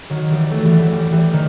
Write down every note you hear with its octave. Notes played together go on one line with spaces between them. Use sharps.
D#3 F#3
E3 G3
F#3 A3
E3 G3
F#3 A3
E3 G3
E3 G3
D#3